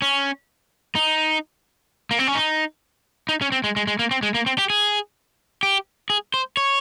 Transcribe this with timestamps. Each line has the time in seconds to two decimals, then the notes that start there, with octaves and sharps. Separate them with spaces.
0.02 C#4
0.95 D#4
2.11 A#3
2.19 C4
2.27 C#4
2.35 D#4
3.29 D#4
3.41 C#4
3.52 C4
3.64 G#3
3.76 G#3
3.87 G#3
3.99 A#3
4.11 C4
4.23 G#3
4.35 A#3
4.46 C4
4.58 G4
4.70 G#4
5.63 G4
6.10 G#4
6.34 C5
6.57 C#5